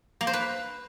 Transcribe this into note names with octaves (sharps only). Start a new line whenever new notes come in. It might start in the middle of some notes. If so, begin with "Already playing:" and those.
A#3
C5
B4